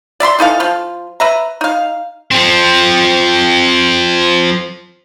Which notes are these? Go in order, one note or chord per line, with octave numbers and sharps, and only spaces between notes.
D5 E5 B5 C6
E3 D#4 A4 F5
F3 F4
B4 E5 A#5
D#4 F5
F3 C4